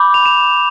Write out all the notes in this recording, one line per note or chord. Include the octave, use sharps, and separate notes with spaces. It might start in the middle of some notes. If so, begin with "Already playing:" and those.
Already playing: B5 D6 G6
F7
E7